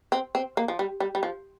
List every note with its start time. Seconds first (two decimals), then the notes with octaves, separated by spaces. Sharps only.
0.12 C4
0.35 C4
0.57 A#3
0.68 F3
0.79 G3
1.00 G3
1.15 G3
1.23 F3